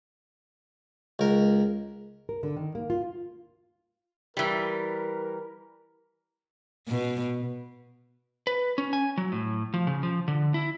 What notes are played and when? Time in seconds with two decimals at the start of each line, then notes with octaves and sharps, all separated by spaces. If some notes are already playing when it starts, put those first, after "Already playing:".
1.19 C#2 A#4
2.29 A#4
2.43 D3
2.56 D#3
2.75 A#3
2.90 F4
4.37 E3 G3 A#4
6.88 B2
8.47 B4
8.78 C#4
8.93 G#5
9.18 F#3
9.32 A2
9.74 F3
9.87 C#3
10.03 F3
10.28 D3
10.54 E4